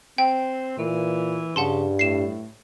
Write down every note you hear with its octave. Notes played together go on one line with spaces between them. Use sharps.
C4 G5
A#2 E3
G2 C#3 F#5 A5 C6
A2 C7 E7